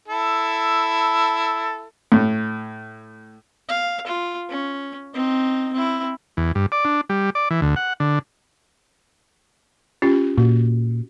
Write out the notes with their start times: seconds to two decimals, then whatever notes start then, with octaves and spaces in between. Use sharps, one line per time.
0.08 E4 A4
2.12 A2
3.69 F5
4.07 F4
4.50 C#4
5.14 C4 D#4
5.73 C4 E4
6.37 E2
6.55 G2
6.72 D5
6.85 D4
7.09 G3
7.35 D5
7.50 E3
7.62 D2
7.76 F#5
8.00 D3
10.02 C#4 F4 G4
10.38 A#2 F#4